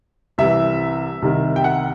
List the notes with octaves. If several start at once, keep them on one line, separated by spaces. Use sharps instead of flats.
C2 C3 E3 E5
C2 C3 D#3
G5
F#5